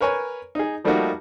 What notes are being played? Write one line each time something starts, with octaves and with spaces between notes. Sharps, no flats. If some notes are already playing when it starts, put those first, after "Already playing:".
A#4 B4 C#5 G#5
D#4 G#4
F3 G3 A3 A#3 D#4 F#4